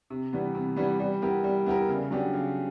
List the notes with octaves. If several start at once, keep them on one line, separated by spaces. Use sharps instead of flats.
C3
E3 G3 B3
C3
E3 G3 B3
G3
B3 E4 G4 A#4
G3
B3 E4 G4 A#4
C#3
F#3 B3 D4 G4
C#3